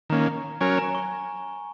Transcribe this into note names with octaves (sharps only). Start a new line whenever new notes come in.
D#3 A#3 C#4 A#5
F#3 C#4 A#4 C#5 G#5
A#5
A#5
C#6